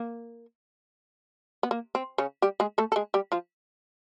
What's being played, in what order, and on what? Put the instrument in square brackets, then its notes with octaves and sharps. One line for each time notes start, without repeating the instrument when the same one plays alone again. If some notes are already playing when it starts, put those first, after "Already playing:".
Already playing: [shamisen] A#3
B3
A#3
C4
C#3 C#4
G3 G4
G#3 G#4
A3 A4
A4
G#3 G#4
G3 G4
F3 F4